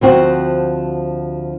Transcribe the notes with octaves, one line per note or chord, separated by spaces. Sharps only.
D2 F3 C4 F#4